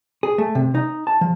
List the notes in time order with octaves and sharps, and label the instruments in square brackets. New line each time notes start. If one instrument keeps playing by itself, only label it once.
[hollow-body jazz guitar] G#4
A3
C3
D#4
A5
F3